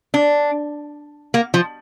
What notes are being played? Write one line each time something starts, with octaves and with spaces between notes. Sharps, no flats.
D4
A#3
F3